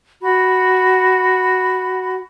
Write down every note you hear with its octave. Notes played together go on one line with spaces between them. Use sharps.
F#4 B5